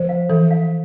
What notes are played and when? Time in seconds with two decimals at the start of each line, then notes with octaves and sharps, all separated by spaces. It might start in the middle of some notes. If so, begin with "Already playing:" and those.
Already playing: F3 C5
0.09 F5
0.29 E3 A4
0.51 F5